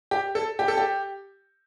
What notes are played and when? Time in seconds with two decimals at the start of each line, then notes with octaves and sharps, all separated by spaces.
0.11 G4
0.35 A4
0.59 G4
0.68 A4
0.77 G4